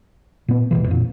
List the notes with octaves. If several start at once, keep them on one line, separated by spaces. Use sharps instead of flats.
A#2 B3
D#1 A1 B2 E3
F2 A#2